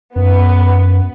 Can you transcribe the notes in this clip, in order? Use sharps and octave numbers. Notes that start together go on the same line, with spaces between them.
F#2 B3